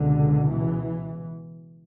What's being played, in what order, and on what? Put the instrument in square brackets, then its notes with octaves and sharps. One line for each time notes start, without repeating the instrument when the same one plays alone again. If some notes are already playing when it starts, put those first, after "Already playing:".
Already playing: [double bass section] C#2 B2 D3
E3